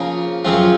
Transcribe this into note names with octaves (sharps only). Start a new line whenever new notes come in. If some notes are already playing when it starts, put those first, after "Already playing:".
Already playing: C#3 F3 A#3
F#2 C#3 F3 C4 F4